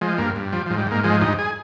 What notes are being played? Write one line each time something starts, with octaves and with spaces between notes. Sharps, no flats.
F3 G#3
G2 A#3
G2
F3 G3
F3
G#2
G3
G#2 A#3
F3 G#3
G2 D#4
G#4